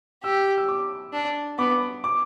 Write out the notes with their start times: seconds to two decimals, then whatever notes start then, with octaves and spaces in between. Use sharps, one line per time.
0.24 G4 E6
0.57 E6
0.68 D6
1.13 D4
1.58 B3 D6
2.04 D6